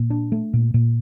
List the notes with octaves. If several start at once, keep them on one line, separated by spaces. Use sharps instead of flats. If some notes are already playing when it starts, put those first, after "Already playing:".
Already playing: A#2
D4
A3
A#2
A#2